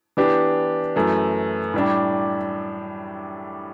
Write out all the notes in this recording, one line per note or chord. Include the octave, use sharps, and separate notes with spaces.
E3 B3 D4 G4
F#2 E3 A3
A2 G3 D4